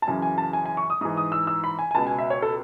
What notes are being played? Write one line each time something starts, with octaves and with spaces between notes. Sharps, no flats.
A5
F#2 C#3 E3 G#5
G#5
A5
G#5
G#5
C#6
D#6
G#2 E3 D#6
D#6
E6
E6
B5
G#5
G#5
C#2 B2 A5
G#5
E5
C#5
A4